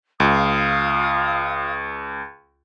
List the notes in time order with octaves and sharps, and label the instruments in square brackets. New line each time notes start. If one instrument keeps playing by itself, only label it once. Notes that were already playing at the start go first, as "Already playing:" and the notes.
[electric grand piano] C#2 [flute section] F4 F5 D#6